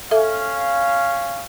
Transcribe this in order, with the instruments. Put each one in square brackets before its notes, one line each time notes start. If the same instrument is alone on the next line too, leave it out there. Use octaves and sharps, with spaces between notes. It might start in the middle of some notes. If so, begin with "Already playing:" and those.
[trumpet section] C#4 F5 [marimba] A4 E5